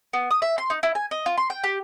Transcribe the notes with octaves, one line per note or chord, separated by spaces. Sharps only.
B3
D#6
E5
C6
D#4
E4
G#5
D#5
F4
C6
G5
G4